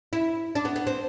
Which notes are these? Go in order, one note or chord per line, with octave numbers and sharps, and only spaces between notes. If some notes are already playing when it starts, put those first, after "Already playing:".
E4
D4
B3
B3
C4